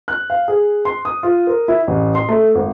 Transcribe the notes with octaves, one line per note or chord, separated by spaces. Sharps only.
F#6
F5
G#4
C6
D#6
F4
A#4
E4
A1
C6
A3
G#1